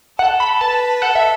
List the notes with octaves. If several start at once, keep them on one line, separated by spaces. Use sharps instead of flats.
A4 F#5
B5
B4 A5
A4 F#5
E5